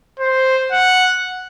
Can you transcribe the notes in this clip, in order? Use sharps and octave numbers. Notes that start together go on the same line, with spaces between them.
C5
F#5